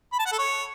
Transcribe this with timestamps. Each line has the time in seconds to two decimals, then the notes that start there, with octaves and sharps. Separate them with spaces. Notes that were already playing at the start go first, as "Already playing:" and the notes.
0.12 B5
0.19 A5
0.26 F#5
0.32 A4
0.39 C#5